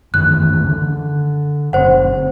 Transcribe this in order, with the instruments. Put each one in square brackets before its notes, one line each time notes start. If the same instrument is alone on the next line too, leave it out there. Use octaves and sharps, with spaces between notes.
[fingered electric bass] F#2 D#3 E3 [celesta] F#6
[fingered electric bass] D3
[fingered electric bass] F#1 A2 C4 [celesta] C5 F#5